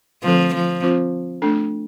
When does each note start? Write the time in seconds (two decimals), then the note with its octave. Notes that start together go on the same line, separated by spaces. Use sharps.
0.23 D3 F3 A3 C4 A4
0.54 F3
0.82 C4 F4 C5
1.42 A3 D4 A4